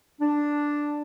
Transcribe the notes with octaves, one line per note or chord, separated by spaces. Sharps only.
D4